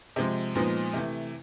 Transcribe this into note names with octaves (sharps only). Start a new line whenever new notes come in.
C3 F3 G#3
A#2 F3 G#3 B3 D#4
C3 E3 A3